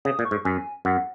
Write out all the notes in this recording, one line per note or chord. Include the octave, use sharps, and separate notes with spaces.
C#3 D#6
A#2
C#6
G#2
F#2 G#5
F#2 F#5